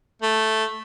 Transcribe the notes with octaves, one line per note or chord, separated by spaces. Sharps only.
A3